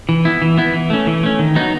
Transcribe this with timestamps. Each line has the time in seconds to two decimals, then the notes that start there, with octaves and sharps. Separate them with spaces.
0.09 E3
0.25 B3 E4
0.42 E3
0.58 B3 E4
0.74 E3
0.90 A3 C#4
1.07 E3
1.23 A3 C#4
1.39 D#3
1.56 F#3 B3 D#4